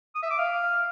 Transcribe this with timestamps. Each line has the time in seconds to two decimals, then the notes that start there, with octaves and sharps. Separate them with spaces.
0.15 D#6
0.23 E5
0.31 D6
0.38 F5